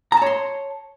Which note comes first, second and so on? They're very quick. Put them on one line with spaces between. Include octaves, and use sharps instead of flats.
A#5 A5 C#5 C6